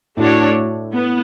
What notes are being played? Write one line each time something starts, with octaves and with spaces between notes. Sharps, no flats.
A2 A3 D4 F#4 C#5
B3